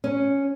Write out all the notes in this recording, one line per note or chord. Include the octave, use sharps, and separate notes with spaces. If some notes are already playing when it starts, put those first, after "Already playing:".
C#4